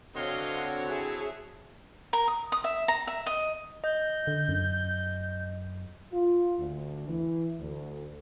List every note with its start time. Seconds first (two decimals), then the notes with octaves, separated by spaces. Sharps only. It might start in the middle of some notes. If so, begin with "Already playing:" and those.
0.16 D3 C4 F#4 C#5 D#5 F5 C6
0.54 F#5
0.89 E4 G#4 E5 G#5 A5
2.13 A#4
2.28 D#6
2.52 D#6
2.64 E5
2.88 A#5
3.07 E5
3.26 D#5
3.84 D#5 G6
4.27 D3
4.49 F#2
6.12 F4
6.58 D2
7.08 E3
7.60 D2